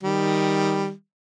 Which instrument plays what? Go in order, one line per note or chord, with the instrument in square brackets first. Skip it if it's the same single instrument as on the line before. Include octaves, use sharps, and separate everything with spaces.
[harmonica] D#3 G3